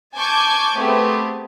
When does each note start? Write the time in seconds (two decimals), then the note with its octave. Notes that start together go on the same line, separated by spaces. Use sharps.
0.15 G#5 A5 C#6 D6 G6 G#6
0.76 A3 B3 C4 G4 G#4